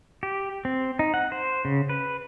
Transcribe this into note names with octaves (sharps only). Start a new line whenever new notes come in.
G4
C4
D#4
F#5
C5
C#3
B4